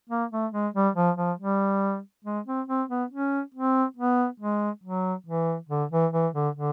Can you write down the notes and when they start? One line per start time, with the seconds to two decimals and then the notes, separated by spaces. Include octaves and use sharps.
0.10 A#3
0.32 A3
0.53 G#3
0.74 G3
0.95 F3
1.17 F3
1.39 G3
2.24 G#3
2.47 C4
2.68 C4
2.89 B3
3.11 C#4
3.54 C4
3.97 B3
4.40 G#3
4.84 F#3
5.26 E3
5.69 D3
5.92 E3
6.13 E3
6.34 D3
6.55 D3